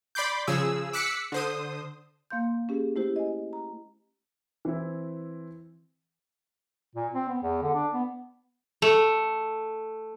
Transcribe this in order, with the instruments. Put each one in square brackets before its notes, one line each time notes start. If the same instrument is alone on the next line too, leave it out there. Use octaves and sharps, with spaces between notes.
[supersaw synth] D5 B5 C6 D6 G6
C#3 F3 G#4 E6
D6 E6 F#6 B6 C#7
D3 C5 D#6
[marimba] A#3 F5 C6 G6
C#4 G4 G#4
A3 E4 G4 C5
D#5 G#5
A#5
[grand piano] E3 C4 E4
[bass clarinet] A#2
C4
B3
E2
D3
D4
B3
[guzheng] A3